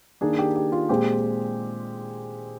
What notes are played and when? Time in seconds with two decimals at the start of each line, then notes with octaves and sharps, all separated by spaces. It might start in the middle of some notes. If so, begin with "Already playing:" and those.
0.21 D#3 A#3 D4 G#4
0.39 G4
0.56 G4
0.72 F4
0.89 A#2 G#3 C4 G4